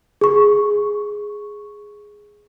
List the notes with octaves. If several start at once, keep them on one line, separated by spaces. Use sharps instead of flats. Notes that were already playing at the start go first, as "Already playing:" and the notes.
G#4 C#6